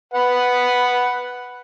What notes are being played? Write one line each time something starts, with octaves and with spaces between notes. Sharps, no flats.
B4 F#5